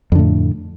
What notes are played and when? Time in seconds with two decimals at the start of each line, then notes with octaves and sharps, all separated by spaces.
0.12 F2
0.15 D3
0.19 A2